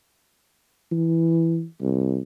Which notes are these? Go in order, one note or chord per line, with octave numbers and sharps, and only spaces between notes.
E3
C2